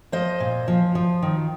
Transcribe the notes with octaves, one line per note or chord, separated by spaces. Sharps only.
F3 C5 D#5
A#2
F3
F3
D#3